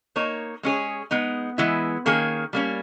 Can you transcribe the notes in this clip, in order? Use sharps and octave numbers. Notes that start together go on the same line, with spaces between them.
A#3 D#4 A#4 C#5
G#3 C#4 G#4 C#5
G#3 B3 D#4
E3 G#3 B3 E4
D#3 A#3 C#4 G#4
G3 A#3 C#4